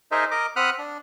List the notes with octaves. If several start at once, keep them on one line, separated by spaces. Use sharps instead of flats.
D#4 G#4 A#4 C5 D#5 E5
A#4 D#5 D6
C4 F#5 B5 D#6 F6 F#6
D4